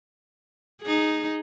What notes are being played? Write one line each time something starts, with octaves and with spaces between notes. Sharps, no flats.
D#4 G#4